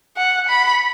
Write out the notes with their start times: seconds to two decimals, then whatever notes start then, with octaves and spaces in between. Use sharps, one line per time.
0.17 F#5
0.48 B5